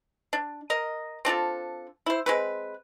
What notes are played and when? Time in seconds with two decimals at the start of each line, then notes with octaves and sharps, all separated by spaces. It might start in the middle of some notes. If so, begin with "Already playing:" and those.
0.33 D4
0.70 A#4 D#5
1.25 C4 D4 F4 A4
2.06 E4 C5
2.26 G#3 C4 B4